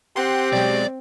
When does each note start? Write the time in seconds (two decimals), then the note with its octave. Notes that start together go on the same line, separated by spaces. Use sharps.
0.16 C4 G4 F#5 C6
0.53 B2 F#3 G#3 D5